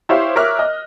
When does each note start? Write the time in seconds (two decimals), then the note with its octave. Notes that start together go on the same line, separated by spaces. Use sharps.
0.09 E4 G4 C5 C#5 E5 F5
0.36 A#4 C#5 E5 D6 F6 F#6
0.59 D#5